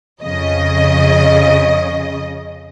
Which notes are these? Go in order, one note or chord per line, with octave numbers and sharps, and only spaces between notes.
F2 C#3 D#5